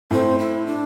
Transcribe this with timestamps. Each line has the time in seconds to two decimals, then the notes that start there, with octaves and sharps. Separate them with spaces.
0.11 A2 C4
0.39 E4
0.66 D4